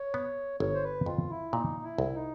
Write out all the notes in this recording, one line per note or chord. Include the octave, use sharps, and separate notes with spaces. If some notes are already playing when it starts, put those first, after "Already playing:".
Already playing: C#5
B3
G1 C#5
C5
B4
F2 F4
E4
A#2 D#4
E4
C2
D#4